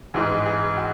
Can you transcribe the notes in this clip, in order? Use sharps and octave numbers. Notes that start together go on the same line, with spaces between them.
A1 G#2 E3 G#3 G#4
G#4
F#4